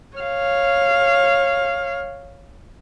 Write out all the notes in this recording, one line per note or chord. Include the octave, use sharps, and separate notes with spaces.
C#5 F5